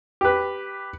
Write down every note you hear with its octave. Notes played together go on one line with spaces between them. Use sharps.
G4 B4